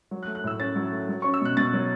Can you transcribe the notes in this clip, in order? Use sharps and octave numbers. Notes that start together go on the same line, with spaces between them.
F#3
F#6
A3
F#6
A2 E6
C#4 A6
F#3
A3
F#3
C#4 C#6
E6
B2 F#6
B2 A6
F#3